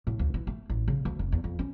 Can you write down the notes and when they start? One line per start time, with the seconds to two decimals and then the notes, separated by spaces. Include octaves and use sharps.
0.07 A2
0.19 D2
0.34 E3
0.47 A3
0.69 A1
0.88 C#3
1.05 D2
1.19 F1
1.32 E2
1.44 F2
1.59 C#4